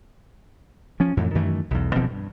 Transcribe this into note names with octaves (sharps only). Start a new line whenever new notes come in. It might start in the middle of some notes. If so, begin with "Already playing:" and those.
F3 C#4
F2 A2 E3
F#2 D#3 E3 A3
B1 E2
D1 B2 F3 C4
G2